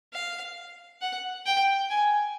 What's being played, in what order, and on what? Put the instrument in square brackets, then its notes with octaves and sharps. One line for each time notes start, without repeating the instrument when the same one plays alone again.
[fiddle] F5
F#5
G5
G#5